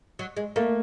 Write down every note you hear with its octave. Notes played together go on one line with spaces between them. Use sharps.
F#3
G#3
A3 A#3